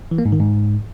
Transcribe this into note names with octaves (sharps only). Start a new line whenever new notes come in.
E3
A#3
G#2
D#3
G#2